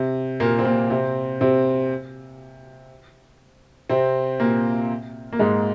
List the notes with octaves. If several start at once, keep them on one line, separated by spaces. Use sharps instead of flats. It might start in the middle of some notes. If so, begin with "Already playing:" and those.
Already playing: C3
A#2 A#3
C4
A#2 A#3
C3 C4
C3 C4
C3 C4
A#2 A#3
A#3
G#2 G#3